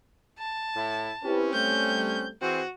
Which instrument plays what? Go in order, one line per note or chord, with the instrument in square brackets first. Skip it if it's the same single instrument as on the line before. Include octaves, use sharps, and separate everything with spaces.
[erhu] A5
[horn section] A2 E4
[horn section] C4 C#4 [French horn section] E4 G4 B4
[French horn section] G3 A3 [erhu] G6
[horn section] E3 C4 G#4 [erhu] F#4